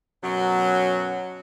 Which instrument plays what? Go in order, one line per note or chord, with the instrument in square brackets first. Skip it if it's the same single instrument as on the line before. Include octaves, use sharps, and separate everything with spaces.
[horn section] F#2 B2 F#3